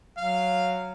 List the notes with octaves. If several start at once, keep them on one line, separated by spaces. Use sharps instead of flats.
F#3 F5